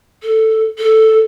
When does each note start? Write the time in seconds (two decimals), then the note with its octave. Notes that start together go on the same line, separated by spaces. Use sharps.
0.23 A4
0.78 A4